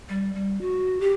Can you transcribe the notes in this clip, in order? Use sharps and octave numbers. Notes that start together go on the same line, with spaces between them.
G3
G3
F#4
G4